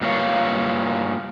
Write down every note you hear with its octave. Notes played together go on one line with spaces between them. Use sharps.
G2 A#3 F4 A#4 C#5 F5